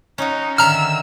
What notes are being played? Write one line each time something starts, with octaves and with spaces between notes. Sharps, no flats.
C#4 D#4 F#4
D3 D#3 E5 A#5 E6 F6